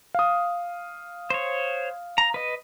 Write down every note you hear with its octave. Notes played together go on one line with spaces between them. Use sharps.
F5 D#6
C5 C#5
A#5
B4 D#5